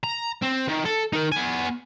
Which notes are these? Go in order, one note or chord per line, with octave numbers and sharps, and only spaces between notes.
A#5
C4
D#3
A4
D#4 A#4
B3 G#5